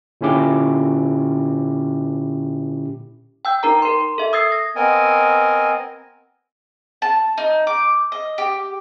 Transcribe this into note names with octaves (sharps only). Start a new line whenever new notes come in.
A#2 D3 C#4 E4 G4 D6
G5 E6 G6
D#4 A#4 A#5
A#4 C6
A4 E5
D#6 E6 G#6 A6 C7
A#6
B3 C4 A#4 D#5 G#5
A5
D#4
D6
D#5
G4